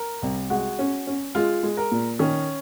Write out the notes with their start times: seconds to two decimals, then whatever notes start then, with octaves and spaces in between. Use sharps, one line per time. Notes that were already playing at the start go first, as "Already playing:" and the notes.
Already playing: A#4
0.22 C2
0.50 G#3 F#4
0.79 C#4
1.07 C#4
1.35 G#3 F4
1.63 G#3
1.77 A#4
1.91 A#2
2.19 D#3 C#4